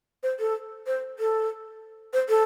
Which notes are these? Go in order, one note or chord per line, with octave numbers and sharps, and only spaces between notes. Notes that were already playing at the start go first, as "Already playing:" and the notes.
C5
A4
C5
A4
C5
A4